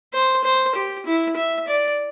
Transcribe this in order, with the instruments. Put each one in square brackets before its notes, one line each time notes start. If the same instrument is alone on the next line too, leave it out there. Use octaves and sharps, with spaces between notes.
[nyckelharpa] C5
C5
G4
E4
E5
D5